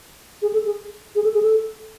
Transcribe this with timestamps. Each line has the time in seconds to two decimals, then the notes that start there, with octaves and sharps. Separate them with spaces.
0.42 G#4
0.53 A4
0.66 G#4
1.15 G#4
1.24 A4
1.34 G#4
1.42 A4